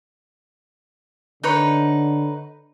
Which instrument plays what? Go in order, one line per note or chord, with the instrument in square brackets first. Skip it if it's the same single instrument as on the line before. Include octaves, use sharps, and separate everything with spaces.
[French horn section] D3 [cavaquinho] D#4 B4 C#5